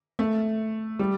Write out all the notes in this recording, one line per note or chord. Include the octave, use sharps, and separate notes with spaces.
A3
G3